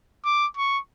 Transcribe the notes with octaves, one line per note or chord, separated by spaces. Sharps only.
D6
C#6